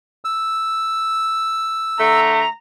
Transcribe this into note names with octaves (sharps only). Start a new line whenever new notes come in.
E6
D3 A3 A#5